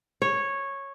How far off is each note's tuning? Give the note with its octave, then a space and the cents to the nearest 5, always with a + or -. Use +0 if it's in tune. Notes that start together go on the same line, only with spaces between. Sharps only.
C#5 -10